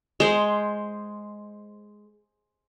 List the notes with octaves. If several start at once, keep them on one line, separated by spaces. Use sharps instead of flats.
G#3 C5